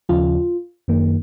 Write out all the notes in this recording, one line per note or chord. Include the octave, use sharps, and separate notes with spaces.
D#2 C#3 F3 F4
F#2 D#3 A#3